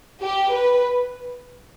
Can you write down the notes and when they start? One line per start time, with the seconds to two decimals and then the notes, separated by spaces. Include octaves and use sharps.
0.22 G4
0.52 B4